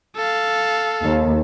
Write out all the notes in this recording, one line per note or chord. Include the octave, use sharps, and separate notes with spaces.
A4 F5
D#2